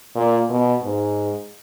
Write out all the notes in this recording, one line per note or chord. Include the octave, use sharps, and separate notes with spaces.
A#2
B2
G#2